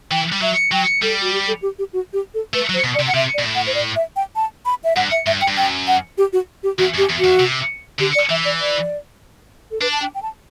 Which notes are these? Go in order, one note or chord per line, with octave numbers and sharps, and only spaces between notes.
E3 G5
G3
F#3 E5
F#3 G5
G3 A4
F#4
G4
A4
G4
G4
F#4
G4
A4
A3 B4
F#3
C5
B2
D5
C3
F#5
C3 E5
D5
B2
A2
F#5
C5
D5
E5
G5
A5
B5
E5
G2 F#5
E5
G2 E5
G5
G2
F#2 G5
F#5
G4
F#4
G4
E2 F#4
F#2
G4
E2
E2 F#4
C3
D3 G4
D5
E3 E5
D5
D5
A4
D4 B4
A5
G5
G5
A5